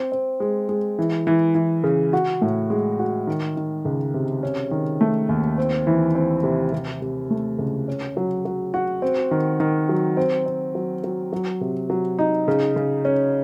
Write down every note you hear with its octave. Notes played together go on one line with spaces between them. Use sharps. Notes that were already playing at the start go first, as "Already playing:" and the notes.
Already playing: C4
C4
G#3
G#3
E3
E3
E3
C#3
F#4
A2
G#3
F#4
D#3
D#3
C#2
C3
C#4
D#3
A3
D#2
C4
E3
C4
C3
C3
C3
A3
C#2
C#4
F#3
F#3
F#4
C4
D#3
D#3
F#3
C4
C4
F#3
F#3
F#3
C3
F#3
D#4
C#3
C#3
C#4